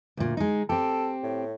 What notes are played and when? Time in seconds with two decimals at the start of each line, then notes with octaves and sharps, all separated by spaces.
0.17 D2 A#2
0.37 G#3 D#4
0.69 C4 G4 A4
1.23 A2